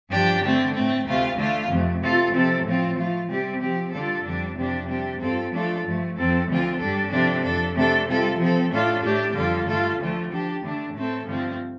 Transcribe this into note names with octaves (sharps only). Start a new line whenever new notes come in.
G2 F3 D4 G4
D3 A3 C4
A2 A3 C4
D2 C3 A3 F4
D3 A3 F4
F2 C3 A3
C3 A3 F4 A4
C3 F3 C4 A4
A2 F3 C4 F4
F3 A3 F4
C3 G3 C4 G4
F3 C4 G4
D3 G3 D4 F4 A4
F2 D3 G3 D4
F2 C3 F3 D4 G4
C3 G3 D4 G4
G2 G3 C4 F4 A4
F3 A3 D4 F4 A4
G2 F3 A3
F2 F3 C4 A4
D2 D3 F3 C4 F4
G2 G3 D4 A4
C3 F3 D4 A4
F2 F3 D4 A4
C3 A3 D4 A4
C3 G3 F4 A4
F3 C4 A4
A2 A3 D4 F4 A4
A2 A3 D4 G4
F2 D3 G3 F4 A4
G2 D3 A3 F4 A4
D2 D3 F3 A3 F4
F3 D4 G4
D3 A3 D4
A2 A3 C4 A4
G2 D3 F3 A3 C4